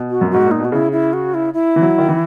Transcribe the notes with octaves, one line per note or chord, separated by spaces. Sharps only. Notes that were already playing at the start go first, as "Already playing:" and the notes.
Already playing: B2
F#4
F#2
G#2 F#4
A#2 D#4
B2 F#4
C#3 E4
E4
F#4
E4
E4
E3
F#3
D#3
E3